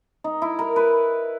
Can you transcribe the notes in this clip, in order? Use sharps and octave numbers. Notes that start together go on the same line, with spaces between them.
D#4
E4
A#4
B4